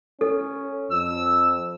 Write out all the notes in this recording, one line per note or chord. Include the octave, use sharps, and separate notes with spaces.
C#4 A4
F2 E6